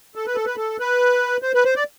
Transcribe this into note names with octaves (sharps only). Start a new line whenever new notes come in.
A4
B4
A4
B4
A4
B4
C5
B4
C5
D5